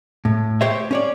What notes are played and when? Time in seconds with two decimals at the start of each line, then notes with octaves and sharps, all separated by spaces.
0.25 A2
0.61 G4 C5 C#5 E5
0.91 C#4 C#5 D5